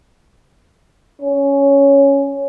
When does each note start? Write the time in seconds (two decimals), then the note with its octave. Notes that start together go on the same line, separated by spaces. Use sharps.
1.21 C#4